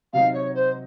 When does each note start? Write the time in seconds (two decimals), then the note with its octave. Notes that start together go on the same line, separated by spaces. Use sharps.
0.13 C3 F#3 C4 D#4 F5
0.34 C#5
0.54 C5